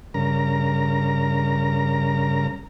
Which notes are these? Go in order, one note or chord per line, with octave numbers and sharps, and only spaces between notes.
G2 C#3 A#4 A#5